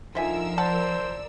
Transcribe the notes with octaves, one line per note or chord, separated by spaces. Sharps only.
D3 F3 D#4 F4 A#4 E5 G#5 E6
C5 D5 F#5 A5